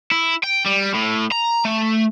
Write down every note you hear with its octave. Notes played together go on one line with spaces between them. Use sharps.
E4
G5
G3
A2
A#5
A3